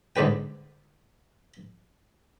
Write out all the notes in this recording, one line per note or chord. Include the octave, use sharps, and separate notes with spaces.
G#2 D3 D4 B4 G5